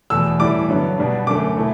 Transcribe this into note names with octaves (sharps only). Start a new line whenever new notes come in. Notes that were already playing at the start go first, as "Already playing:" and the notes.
E2 B2 A3 E6
A2 E3 G3 D6
G2 D3 F#3 B3
B2 G3 B3 D4
F#2 D3 A3 D6
B2 A3 E4